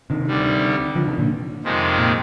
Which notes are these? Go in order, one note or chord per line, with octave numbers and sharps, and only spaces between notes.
C3 D#3
D2 D3 G3
D3 F3
C3 D#3
A#2 D3
F2 C3 D#3 G#3 D#4
A#2